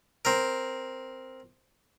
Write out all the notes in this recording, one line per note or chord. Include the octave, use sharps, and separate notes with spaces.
C4 A#4